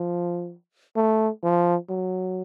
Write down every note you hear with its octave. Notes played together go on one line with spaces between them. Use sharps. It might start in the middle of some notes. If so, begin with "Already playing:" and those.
Already playing: F3
A3
F3
F#3